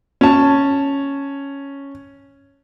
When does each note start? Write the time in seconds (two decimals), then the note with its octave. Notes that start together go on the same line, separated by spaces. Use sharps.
0.21 C#4 A5